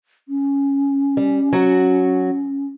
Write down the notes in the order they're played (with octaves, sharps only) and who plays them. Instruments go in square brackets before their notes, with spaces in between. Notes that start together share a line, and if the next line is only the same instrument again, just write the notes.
[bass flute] C#4
[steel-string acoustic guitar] G3
F#3 F#4